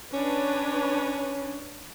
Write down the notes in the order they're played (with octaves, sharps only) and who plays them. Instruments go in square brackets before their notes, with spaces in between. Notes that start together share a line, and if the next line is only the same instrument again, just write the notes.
[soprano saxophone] C#4 [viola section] D4 B4 C#5